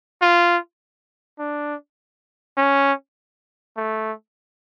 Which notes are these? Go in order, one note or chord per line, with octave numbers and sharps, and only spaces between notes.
F4
D4
C#4
A3